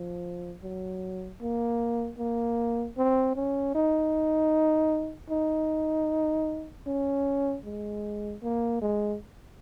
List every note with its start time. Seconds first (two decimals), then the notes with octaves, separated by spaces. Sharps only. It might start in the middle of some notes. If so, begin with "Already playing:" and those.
Already playing: F3
0.63 F#3
1.41 A#3
2.18 A#3
2.97 C4
3.35 C#4
3.74 D#4
5.30 D#4
6.86 C#4
7.65 G#3
8.42 A#3
8.81 G#3